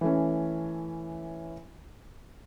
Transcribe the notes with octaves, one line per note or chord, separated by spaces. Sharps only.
E3 A3 C#4